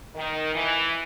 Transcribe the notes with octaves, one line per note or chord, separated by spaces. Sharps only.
D#3
E3